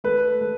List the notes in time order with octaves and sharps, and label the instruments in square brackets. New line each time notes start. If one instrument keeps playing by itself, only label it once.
[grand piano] A3 B4
A3